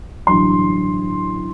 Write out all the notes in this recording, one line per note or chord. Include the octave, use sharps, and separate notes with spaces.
A1 G2 D3 F#3 C6